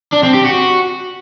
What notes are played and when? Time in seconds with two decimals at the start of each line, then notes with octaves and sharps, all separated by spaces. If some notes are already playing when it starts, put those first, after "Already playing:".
0.12 D4
0.23 C4
0.34 G4
0.45 F#4